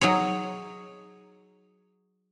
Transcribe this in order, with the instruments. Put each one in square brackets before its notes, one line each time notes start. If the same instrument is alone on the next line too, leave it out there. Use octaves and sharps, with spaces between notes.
[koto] F#3 D#4 G#4 C#5